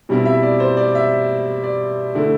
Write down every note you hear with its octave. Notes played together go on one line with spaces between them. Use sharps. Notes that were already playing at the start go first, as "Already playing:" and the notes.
B2 G3 C4 E4
E5
D5
C5
D5
E5
D5
D3 A3 E4